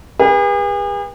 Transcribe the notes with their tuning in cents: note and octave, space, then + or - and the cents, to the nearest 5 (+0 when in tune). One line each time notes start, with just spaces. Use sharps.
G#4 -45 B4 -35